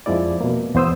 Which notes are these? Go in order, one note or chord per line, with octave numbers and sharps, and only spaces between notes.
F2 F3 G#3 E4 D5
B2 A#3
E2 B3 C5 D#6 E6